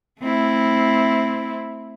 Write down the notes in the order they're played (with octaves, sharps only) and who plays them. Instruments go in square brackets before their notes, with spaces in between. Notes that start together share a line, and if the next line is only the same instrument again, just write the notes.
[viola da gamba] A3 C4 E4